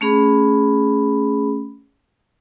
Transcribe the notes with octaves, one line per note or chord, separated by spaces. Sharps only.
A3 C#4 G#4 B5